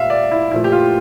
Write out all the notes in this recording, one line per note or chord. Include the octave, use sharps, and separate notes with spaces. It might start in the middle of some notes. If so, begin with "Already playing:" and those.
Already playing: A#2 G3 E5 F5
D5
E4
A#2 F3 A3 E4
G4
F4